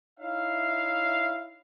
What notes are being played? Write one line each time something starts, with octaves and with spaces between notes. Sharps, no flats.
D#4 E4 C#5 E5 F5